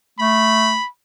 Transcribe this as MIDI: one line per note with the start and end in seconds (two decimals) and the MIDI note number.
0.19 0.77 57
0.19 0.88 83